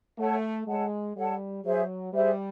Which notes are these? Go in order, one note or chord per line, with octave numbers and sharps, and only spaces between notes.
A3 A4 C#5 F#5 A5
G#3 A4 C#5 F#5 A5
G3 A4 C#5 F#5 A5
F#3 G#4 C5 E5
G3 G#4 C5 E5